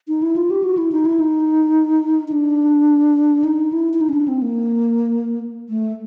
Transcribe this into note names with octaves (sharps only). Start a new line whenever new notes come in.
D#4
E4
F4
G4
F#4
E4
D#4
E4
D#4
D#4
D4
D#4
E4
E4
D#4
C#4
D4
C4
A#3
A3